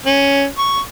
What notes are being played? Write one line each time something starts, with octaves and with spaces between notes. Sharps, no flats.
C#4
C#6